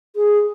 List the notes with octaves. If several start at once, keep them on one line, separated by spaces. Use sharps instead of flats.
G#4